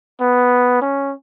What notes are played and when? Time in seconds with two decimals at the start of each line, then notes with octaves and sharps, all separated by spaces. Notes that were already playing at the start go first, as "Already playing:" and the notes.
0.21 B3
0.81 C#4